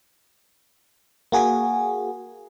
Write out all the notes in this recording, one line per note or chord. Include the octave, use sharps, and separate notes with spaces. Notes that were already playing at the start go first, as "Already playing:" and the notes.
A#3 F#4 G#4